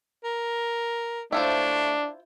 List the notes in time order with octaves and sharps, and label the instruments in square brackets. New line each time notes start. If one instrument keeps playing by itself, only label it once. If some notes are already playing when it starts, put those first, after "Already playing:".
[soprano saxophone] A#4
[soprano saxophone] A3 [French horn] D4 [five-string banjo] E4 F4 C5